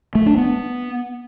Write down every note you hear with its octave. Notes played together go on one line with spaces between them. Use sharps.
A3
D4
B3